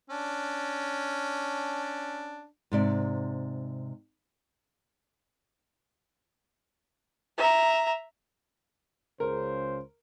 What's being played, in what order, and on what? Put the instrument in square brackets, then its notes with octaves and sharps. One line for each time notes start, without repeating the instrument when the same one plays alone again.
[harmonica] C#4 D4
[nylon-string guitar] G#2 C3 D5
[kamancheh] E5 A#5
[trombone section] C#2 C#3 C5 [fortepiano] A#4